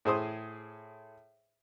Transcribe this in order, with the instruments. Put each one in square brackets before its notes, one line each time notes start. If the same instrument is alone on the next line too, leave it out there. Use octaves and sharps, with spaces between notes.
[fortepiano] A2 G#4 C5 D#6